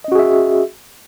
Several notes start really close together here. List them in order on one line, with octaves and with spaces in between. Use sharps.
D#5 C#4 F#4 G#4 E5